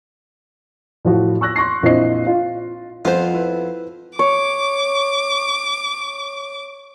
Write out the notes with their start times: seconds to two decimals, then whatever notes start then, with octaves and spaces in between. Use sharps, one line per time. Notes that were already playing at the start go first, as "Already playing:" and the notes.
1.05 A2 F3 F#4
1.41 C#6 E6 F#6 A#6
1.56 C6 C#6 A#6 C7
1.82 A#1 A#2 C4 E4 D#5 C7
2.27 F4
3.05 F2 F3 B3 F4 C5
3.34 E4 B4
4.19 C#5 D6